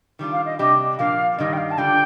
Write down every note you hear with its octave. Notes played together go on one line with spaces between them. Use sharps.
D#3 G3 D4 F4
F5
D#5
C3 G3 D4 G4 D#5
A#2 F3 A#3 D4 F5
G2 D#3 G3 D#5
G5
F5
A5
D3 G3 D4 F4 G5